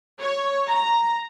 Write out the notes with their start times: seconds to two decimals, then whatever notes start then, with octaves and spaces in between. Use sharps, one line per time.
0.20 C#5
0.69 A#5